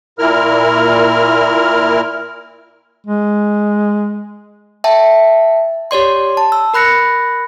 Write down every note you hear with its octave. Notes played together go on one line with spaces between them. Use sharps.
A#2 E4 A#4 F6
G#3
E5 G5 A5
G4 C#5 D5 C6
A5
E6
A#4 B5 F#6 A#6 C#7